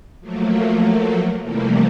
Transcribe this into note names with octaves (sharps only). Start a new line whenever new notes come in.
F3 F#3 A3 A#3
C3 E3 F3 G3 A3 A#3